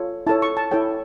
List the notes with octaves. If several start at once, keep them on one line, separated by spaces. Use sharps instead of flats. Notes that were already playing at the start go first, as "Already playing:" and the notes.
Already playing: F4 A4 C#5
E4 A4 C#5 A5
C#6
A5
E4 A4 C#5 G5